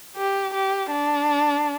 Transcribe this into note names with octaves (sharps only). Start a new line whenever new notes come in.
G4
G4
D4